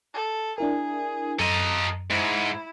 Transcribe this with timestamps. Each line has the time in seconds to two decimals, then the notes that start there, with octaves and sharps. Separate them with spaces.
0.14 A4
0.58 D4 E4 G#4 A#4
1.39 F#2 A4 D#5 A#5
2.11 G#2 E4